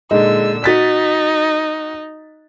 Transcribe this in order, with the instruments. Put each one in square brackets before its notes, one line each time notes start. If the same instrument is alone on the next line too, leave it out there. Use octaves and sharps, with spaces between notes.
[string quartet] A#2 D3 E6 [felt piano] G#3 D#4
[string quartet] D#4 [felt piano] F#4 A6 B6